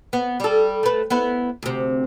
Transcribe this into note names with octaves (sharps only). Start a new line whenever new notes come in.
B3
G3 A4
A3 B4
B3 E4 B4
D2 C3